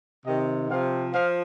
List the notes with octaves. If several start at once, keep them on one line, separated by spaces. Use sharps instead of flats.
C3 D#3 D#5
C3 F3 F5
F3 F5